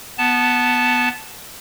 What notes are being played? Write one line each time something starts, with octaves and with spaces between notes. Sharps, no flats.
B3 A5